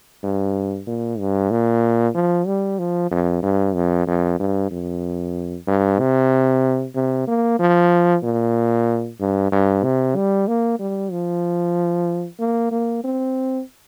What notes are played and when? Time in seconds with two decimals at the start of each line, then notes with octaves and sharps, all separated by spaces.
0.24 G2
0.87 A#2
1.19 G2
1.51 A#2
2.15 F3
2.47 G3
2.79 F3
3.11 F2
3.43 G2
3.75 F2
4.07 F2
4.40 G2
4.71 F2
5.68 G2
6.00 C3
6.95 C3
7.28 A#3
7.59 F3
8.24 A#2
9.20 G2
9.52 G2
9.84 C3
10.16 G3
10.48 A#3
10.80 G3
11.12 F3
12.40 A#3
12.72 A#3
13.04 C4